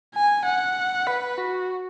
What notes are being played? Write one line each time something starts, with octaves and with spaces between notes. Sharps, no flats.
G#5
F#5
B4
F#4